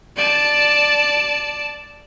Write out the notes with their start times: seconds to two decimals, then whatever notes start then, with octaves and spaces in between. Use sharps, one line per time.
0.17 D5 A5